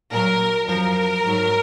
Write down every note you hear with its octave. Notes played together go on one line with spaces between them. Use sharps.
A#2 F#3 A#4
F#2 F3 A#4
G#2 F#3